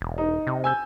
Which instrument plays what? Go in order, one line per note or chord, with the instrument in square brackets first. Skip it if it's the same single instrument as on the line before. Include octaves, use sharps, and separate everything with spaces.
[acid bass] E1
[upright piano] D#4
[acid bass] C3
[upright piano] G#5 E6 G6